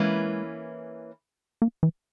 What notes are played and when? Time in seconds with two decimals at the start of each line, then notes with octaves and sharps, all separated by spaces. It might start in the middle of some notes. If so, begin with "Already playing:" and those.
Already playing: E3 G#3 A#3 C#4 E4 B4
1.62 A#3
1.83 E3